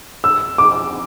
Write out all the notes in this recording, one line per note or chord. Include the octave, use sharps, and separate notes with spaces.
E6
D6